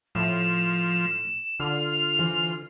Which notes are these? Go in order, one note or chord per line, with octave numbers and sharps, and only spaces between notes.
A2 F3 E7
D3 F4 F7
E3 C5